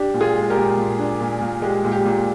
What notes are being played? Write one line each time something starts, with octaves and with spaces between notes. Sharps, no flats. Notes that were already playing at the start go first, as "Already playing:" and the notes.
Already playing: D4 G4
A#2
F4 G#4
G#3
G4 A#4
A#2
A#2
D4
A#2
A#2
G#3 G4
A#2
G4
A#2